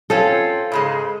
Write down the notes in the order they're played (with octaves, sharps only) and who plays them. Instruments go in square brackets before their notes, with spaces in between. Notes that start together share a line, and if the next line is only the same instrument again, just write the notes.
[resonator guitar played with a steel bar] C4 C#4 F4 [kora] A4
[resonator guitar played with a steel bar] G#2 C#3 G#3